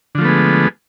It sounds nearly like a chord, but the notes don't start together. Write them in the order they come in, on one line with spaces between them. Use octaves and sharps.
D3 F3 A3 B3 G#3